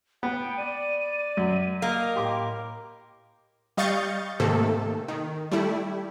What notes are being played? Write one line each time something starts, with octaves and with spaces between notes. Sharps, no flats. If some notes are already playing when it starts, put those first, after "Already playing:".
B3 G5
D5 D#7
F#2
A#3 D#5 F6
A2 G4 C6 D6
G3 D#5 F5 C#6 G6 A6
G#2 C3 D#3 A3 A#3 A4
D#3
G3 A3 E4